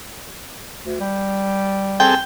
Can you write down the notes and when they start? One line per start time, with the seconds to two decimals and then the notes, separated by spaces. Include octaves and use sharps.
0.85 D2
1.00 G3
2.00 C4 G#4 A4 G5